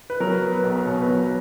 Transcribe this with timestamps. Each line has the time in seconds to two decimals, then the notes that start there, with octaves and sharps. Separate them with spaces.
0.10 B4
0.20 F#3 A#4
0.42 B3
0.52 B4
0.63 B1
0.85 B2 C#5
1.01 B4
1.07 F#3
1.18 B4